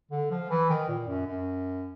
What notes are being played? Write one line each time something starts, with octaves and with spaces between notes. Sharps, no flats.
D3
F3
E3
D#3
A#2
F#2
F#2